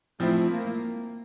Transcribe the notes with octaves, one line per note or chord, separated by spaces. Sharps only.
F3 A3 C4 E4
A#3